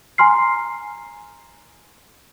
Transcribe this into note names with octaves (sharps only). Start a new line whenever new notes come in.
G#5 A#5 C6 F6 C7